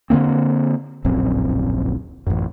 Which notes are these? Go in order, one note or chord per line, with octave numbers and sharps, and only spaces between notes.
D3 D#3 A#3 C4
D1 A#1 F#2 C4
A1 F#2